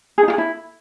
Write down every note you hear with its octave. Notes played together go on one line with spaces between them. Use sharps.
G#4
D#4
F4
G#4
E4